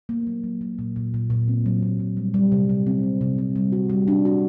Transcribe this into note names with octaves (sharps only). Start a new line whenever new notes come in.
A#3
F#3
F#3
F#3
A#2
A#2
A#2
A#2
C4
F#3
A#2
A#2
G3
G3
C3
C3
C4
C3
C3
C4
G3
F#4
G3
D4
F#4